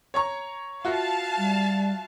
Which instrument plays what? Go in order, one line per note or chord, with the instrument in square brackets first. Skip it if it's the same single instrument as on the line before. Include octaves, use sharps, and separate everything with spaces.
[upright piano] C#5 A#5 C#6
[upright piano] F4 F#4 E5 [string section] F5 A5
[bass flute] G3